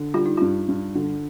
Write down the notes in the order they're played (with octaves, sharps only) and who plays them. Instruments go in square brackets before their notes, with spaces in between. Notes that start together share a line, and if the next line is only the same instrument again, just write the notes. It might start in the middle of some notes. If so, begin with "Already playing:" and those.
Already playing: [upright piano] D3
[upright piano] G3 [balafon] F4
[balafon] D#4
[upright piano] G2 [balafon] F4
[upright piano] G2
D3